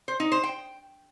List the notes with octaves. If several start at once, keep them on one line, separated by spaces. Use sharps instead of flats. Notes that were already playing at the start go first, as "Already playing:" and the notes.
C5
D#4
C5
G5